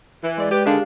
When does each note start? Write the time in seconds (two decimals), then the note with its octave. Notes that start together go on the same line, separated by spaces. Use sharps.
0.24 E3
0.38 G#3 D5
0.51 G4 B4
0.66 D3 D#3 D4 G4 G#4 F5